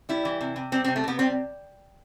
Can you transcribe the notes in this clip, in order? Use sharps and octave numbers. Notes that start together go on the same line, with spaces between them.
G3 E4
E3
C3
C3
G3 C4
C4
C3
A3
C3 B3
G3 C4